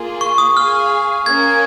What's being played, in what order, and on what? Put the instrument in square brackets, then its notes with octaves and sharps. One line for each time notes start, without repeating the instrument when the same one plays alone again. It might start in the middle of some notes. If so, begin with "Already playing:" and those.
Already playing: [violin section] A#3 F4 G#4
[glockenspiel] C#6
D#6
[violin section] G#4 F5 G#5 [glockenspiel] F6
[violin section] A#3 C#4 A#4 C#5 G#5 [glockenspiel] G#6